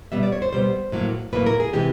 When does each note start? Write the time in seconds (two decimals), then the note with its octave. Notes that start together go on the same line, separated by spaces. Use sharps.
0.12 B2 G3 B3 E5
0.23 D5
0.32 C#5
0.42 C5
0.53 B2 G3 B3 C5
0.92 A2 F#3 A#3
1.33 A2 F#3 A#3 B4
1.46 A#4
1.60 G#4
1.73 C3 E3 G#3 G4